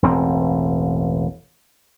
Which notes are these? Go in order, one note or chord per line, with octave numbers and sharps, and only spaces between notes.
E1 A1 C4